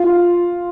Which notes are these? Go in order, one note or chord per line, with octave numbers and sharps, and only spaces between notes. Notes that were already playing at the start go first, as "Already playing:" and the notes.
Already playing: F4